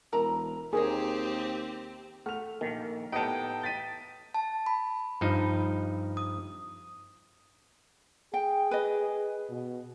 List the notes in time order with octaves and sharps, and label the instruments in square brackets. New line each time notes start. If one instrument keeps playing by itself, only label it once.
[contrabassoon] E1 [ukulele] E4 A#4 A#5
[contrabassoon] D#2 [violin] C4 G4 [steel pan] G#4 [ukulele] A#4 C#5 D#5
[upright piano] A3 [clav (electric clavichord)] F#5 [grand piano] F6 F7
[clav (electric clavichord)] A#1 D#3 [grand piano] A#3
[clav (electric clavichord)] A2 B3 D#4 [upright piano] G4 D#5 A5 [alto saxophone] G5 [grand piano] D7
[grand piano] A6 B6 D#7
[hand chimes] A5
B5
[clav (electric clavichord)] G2 F3 D#4
[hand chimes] D#6
[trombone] G#4 [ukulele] G5
[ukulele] B4 D#5
[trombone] B2